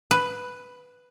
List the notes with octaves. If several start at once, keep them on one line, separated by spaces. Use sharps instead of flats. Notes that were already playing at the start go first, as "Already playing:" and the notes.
B4